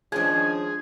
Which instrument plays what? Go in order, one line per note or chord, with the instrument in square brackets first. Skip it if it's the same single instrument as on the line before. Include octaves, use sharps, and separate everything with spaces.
[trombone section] D#3 F3 C#4 [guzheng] G#3 D4 [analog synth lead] G#4 [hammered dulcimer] G#5